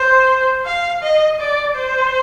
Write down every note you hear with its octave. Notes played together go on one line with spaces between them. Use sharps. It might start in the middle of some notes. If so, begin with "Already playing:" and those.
Already playing: C5
F5
D#5
D5
C5